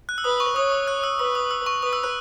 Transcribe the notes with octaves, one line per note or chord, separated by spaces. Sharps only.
F#6
E6
B4 D#6
C#6
C#5 D#6
E6
F#6
E6
B4 E6
D#6
E6
C#6
B4 D#6
E6
F#6